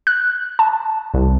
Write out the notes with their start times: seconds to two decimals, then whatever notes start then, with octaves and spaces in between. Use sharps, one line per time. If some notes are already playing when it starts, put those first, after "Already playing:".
0.07 F#6
0.59 A5
1.14 C2